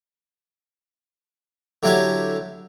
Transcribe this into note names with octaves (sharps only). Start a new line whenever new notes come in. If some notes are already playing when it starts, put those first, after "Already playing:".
D3 F#3 E4 G4 C#5